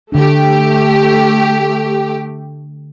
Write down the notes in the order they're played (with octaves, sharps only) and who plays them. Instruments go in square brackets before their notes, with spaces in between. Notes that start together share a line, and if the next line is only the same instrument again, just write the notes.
[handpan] D3 D4 [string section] A3 G4